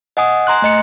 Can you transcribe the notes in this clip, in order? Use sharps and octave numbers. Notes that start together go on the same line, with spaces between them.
D#5 F#5 G#5 D#6
G#5 A#5 C6 F#6
A3 D#5 C#7